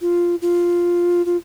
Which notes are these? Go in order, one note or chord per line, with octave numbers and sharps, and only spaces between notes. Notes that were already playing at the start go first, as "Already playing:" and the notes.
F4
F4
F4